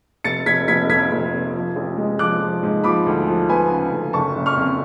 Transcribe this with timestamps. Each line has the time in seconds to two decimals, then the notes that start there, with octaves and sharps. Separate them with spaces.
0.24 F1 A6 C#7
0.46 F1 G#6 B6
0.68 F1 G#6 B6
0.89 F2 G#6 B6
1.11 F1
1.33 F1
1.54 F3
1.76 A1
1.97 G#3
2.19 F3 D6 F#6
2.41 F3
2.63 G#2
2.84 F3 B5 D6
3.06 D2
3.27 F3
3.49 B3 G#5 B5
3.70 C#3
3.92 D2
4.13 F#1 A5 C#6
4.36 F#1
4.46 C#6 F6
4.57 F2